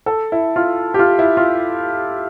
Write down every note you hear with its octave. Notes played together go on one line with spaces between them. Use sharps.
A4
E4
F4
G4
F4
E4
F4